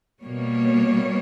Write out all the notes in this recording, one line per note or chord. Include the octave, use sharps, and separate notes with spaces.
B2 G3 A#3 C#5